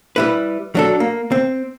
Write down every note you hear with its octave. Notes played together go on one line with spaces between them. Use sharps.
G3 E4 B4
F#3 D4 A4
A#3
C4